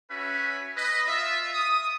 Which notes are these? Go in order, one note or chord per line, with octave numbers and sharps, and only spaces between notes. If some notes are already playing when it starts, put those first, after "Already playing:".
C#4 F#4 B4 E5 G#5 B5
B4 D#5
F4 E5
D#6